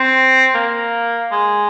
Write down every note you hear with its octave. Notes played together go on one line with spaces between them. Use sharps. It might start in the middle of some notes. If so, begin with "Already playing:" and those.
Already playing: C4
A#3
G#3